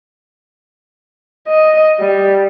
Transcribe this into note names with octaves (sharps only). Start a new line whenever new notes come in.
D#5
G3